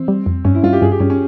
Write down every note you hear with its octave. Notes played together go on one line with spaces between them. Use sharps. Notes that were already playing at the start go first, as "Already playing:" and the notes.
Already playing: E3 C4
G3
F2
G2 C#4
E4
G2 F4
G4
G2 G#4
G4
G2 C#4
C#4